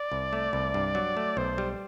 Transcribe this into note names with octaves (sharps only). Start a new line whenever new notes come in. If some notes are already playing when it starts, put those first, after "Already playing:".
Already playing: D5
C2
A3
C2
G2
F#3
A3
B1 C5
G3